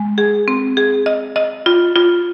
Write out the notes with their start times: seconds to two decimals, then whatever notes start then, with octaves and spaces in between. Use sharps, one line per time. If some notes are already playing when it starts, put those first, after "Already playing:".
Already playing: G#3
0.18 G#4
0.48 C4
0.77 G#4
1.06 D#5
1.36 D#5
1.66 F4
1.96 F4